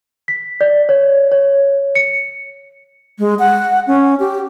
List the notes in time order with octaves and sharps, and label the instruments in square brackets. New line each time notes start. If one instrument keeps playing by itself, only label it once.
[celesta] B6
D5
C#5
C#5
C#7
[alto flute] G#3
F#5
C#4
G4